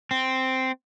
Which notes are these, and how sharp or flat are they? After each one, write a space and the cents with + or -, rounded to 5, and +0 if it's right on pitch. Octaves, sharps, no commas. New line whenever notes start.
C4 -5